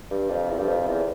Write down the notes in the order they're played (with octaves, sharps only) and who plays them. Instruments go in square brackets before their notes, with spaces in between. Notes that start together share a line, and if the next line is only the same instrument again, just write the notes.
[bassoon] G2
F2
E2
G2
F2
E2